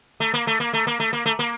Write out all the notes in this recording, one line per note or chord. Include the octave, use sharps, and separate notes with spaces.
A3
A#3
A3
A#3
A3
A#3
A3
A#3
A3
A#3